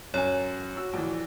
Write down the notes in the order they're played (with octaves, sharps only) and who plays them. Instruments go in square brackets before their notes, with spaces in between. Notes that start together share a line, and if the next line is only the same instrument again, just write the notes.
[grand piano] F#2 G#5 [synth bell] C#5
[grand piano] F#4 [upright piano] E6
[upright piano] A#1 E3